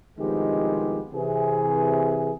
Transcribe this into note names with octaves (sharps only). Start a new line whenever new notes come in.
C2 D#3 F3 G#3 B3 G4
C3 E3 G#4